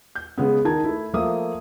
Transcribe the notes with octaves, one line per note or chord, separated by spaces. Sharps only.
G6
C#3 G#3 B3
D#3 D#4 A#4 A5 G#6
A3 E4
F3 A3 A#3 E5 D#6